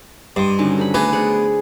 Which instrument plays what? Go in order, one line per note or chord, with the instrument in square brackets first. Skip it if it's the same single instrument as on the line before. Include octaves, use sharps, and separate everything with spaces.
[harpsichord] G2 [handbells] G4 C6 [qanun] D#5
[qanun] D3 D#3 F#3 [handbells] C#4 G#5
[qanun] A4 C5 B5
[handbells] A3 G#5 [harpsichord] B3 [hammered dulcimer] G#4 [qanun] A#5
[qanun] C5 D5 F#5